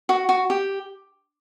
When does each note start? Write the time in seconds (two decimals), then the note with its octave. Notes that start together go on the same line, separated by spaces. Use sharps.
0.09 F#4
0.29 F#4
0.50 G4